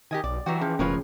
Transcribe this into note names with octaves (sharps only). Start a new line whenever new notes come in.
D#3 G4 D#5 G#5
B1 D5
E3 F#3 G3 F#4 G5
F3 C#4 G#4
E1 A2 C#3 F3 A#4 B4 C#5